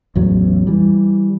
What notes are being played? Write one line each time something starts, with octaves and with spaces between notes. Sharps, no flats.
A1 E2 F#3
E3 G3